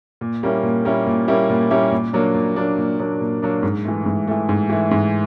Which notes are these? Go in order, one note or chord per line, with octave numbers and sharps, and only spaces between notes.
A#2
G3 A#3 C#4 E4
A#2
G3 A#3 C#4 E4
A#2
G3 A#3 C#4 E4
A#2
G3 A#3 C#4 E4
A#2
F#3 A#3 D4
A#2
F#3 A#3 D4
A#2
F#3 A#3 D4
A#2
F#3 A#3 D4
G#2
E3 A3
G#2
E3 A3
G#2
E3 A3
G#2